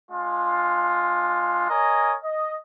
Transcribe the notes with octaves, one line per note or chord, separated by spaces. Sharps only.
G#3 D4 F4
A#4 C#5 D#5 G#5
D#5